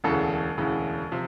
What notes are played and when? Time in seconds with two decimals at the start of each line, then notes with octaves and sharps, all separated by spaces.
0.04 E1 D2 C#3 E3 A4
0.57 E1 D2 C#3 E3
1.12 C3 F3